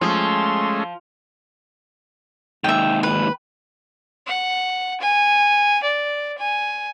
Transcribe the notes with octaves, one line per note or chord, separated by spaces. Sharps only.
F3 G#3 A3 C#4 C6
D#2 G#2 E5 G5
B4
F#5
G#5
D5
G#5